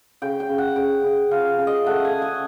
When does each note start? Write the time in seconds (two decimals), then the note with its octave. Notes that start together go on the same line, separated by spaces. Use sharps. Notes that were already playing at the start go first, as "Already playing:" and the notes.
0.22 C#3 G5
0.40 G5
0.49 C#3
0.58 F#5
0.76 C#3 G5
1.04 C#3
1.31 F3 F5
1.59 C#3
1.67 D#5
1.86 A3 F#5
2.05 G#5
2.13 C#3
2.22 G#5